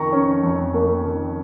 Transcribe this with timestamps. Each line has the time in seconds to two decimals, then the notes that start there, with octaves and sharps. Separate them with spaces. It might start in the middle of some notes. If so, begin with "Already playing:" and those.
Already playing: F2 D#3 A#5 C#6
0.13 C#4
0.43 F2
0.74 A#3
1.04 D#3